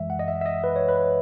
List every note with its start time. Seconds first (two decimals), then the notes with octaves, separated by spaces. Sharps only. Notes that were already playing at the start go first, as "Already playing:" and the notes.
Already playing: F#2 E3 G#3 E5
0.10 F#5
0.19 D#5
0.28 E5
0.41 E5
0.46 D#5
0.64 B4
0.76 C#5
0.88 B4